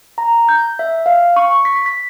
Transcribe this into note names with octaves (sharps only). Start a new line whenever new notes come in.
A#5
G6
E5
F5
C#6
B6
B6